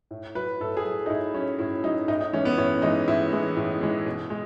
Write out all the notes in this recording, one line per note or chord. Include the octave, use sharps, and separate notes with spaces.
A2
F#3 B4
A2 A4
G#4
F#3
D#4
A2 E4
F#3 C#4
A2 E4
F#3 D#4
A2 D#4
D#4
E3 G#3 C#4
B3
A2 C#4
E3 G#3 D#4
A2 E4
E3 G#3
A2
E3 G#3
B2
G#3